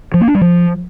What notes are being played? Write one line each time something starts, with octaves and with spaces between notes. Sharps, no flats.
F3
A#3
D4
G3
F3